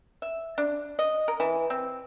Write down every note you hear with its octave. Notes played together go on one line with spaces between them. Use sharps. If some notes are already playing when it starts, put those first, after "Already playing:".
E5
D4
D#5
A#4
E3
C4